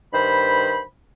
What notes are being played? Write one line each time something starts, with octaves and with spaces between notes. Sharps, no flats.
G2 D#3 C5 B5